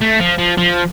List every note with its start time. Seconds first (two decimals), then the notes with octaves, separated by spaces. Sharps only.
0.02 A3
0.20 F3
0.38 F3
0.57 F3